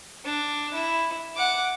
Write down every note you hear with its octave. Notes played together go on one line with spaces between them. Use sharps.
D4
E4
F#5 D6